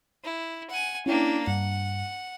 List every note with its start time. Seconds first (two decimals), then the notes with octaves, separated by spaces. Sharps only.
0.24 E4
0.70 F#5 G#5
1.06 A#3 C#4 D4 E4 G5
1.47 G2 F#5